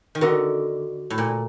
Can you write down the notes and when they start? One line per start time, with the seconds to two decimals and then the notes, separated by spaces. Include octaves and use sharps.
0.15 D#3
0.21 D3 F#4 A#4 D#5 F#5
1.10 A2
1.18 A#2